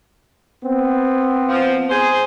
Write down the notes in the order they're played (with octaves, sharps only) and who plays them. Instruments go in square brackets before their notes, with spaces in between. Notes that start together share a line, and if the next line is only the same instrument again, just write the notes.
[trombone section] B3 C4
[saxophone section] F3
G#4 C5